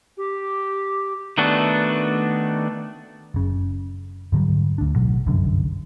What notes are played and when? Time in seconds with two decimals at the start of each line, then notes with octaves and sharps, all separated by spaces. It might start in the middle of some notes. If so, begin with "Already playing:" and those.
0.17 G4
1.38 D#3 A3 B3 D4 F#4
3.34 F#1 C#3
4.32 G#2 D3 F#3 G3
4.78 D2 D4
4.96 A1 B2 F#3
5.27 G1 C2 F#2 D3